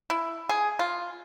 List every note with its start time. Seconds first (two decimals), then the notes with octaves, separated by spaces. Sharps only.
0.10 E4
0.49 G#4
0.79 F4